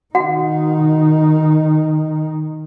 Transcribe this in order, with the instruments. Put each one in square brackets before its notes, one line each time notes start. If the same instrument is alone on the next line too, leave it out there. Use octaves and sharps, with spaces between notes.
[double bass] D#3 D#4 [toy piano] F#4 F#5